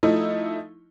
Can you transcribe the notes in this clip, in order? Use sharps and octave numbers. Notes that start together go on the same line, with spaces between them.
F3 A3 D#4 E4